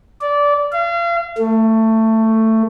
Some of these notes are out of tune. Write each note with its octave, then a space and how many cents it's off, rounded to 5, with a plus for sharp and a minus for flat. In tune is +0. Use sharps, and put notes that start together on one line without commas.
D5 -20
F5 -35
A3 +15